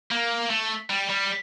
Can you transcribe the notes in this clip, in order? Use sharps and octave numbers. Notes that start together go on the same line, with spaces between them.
A#3
A3
G3
G3